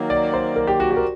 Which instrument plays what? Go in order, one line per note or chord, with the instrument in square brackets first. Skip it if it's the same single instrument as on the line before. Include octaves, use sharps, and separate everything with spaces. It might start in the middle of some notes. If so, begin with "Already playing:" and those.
Already playing: [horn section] D#3 F#3 A#3
[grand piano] D5
C5
A#4
G4
F#4
G4
A#4